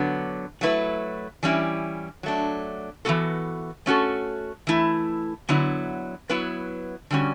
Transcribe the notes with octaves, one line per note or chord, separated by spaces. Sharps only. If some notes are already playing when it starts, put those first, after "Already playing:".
Already playing: D3 F#3 B3
F#3 A3 E4 B4
E3 G3 C#4 E4
F#3 A3 D4
E3 G3 B3 F#4 A4
A3 C#4 F#4 A4
E3 A3 E4
D3 F#3 B3 E4
F#3 B3 E4 B4
D3 G3 C#4 F#4